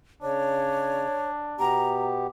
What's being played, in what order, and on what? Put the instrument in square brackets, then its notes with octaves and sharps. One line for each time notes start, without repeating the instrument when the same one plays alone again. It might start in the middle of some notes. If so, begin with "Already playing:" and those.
[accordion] C#3 [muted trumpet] D4 [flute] C#5
[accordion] B2 B3 G4 [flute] A#5